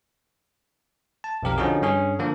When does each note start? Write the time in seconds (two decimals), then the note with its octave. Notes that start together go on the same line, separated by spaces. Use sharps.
1.24 A5
1.43 B1 F2 G4 A#4
1.58 D3 F3 C#4 D#4 F#4 G#4
1.82 G2 C#4 G#4
2.19 D3 F3 A#3 A4